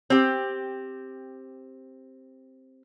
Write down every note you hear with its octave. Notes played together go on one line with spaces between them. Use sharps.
C4 G4